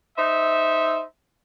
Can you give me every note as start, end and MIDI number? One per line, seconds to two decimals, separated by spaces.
0.17 1.02 63
0.17 1.02 72
0.17 1.02 76